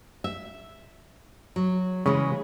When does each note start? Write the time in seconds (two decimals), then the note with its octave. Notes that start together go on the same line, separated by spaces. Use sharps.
0.24 E5
1.56 F#3
2.06 C#3 E3 G#3 C#4